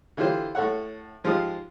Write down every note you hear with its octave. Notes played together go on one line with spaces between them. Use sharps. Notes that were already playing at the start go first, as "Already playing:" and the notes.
D3 E3 F4 G4 C5
A2 A4 C#5 F#5
G#2 F3 G#3 F4 G4 D#6